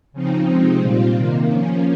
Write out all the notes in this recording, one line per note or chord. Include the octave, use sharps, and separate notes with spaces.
C#3 F3 C4 D#4
C3 F3 G#3 C4 D#4
A#2 G3 C4 F4
C3 D#3 A#3
F3 A#3 C#4